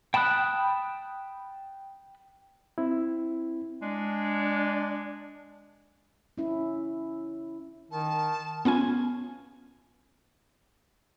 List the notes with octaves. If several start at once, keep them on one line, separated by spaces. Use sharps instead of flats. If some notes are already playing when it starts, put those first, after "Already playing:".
G5 A5 B5 D#6 F#6
C4 E4
G#3 D4
C#4 E4
D#3 A5
B3 C#4 F4 G#5